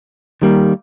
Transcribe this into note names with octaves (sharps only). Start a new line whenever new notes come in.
D#3 G3 A#3